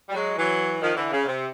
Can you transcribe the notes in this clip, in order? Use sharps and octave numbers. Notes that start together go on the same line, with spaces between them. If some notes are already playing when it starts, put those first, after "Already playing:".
G3
F#3 G#3
E3 F#3
D#3 F3
D3 E3
C#3
C3